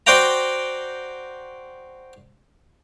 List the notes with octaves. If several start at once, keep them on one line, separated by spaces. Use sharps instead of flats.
F#4 C5 D5 F#5 G5 A#5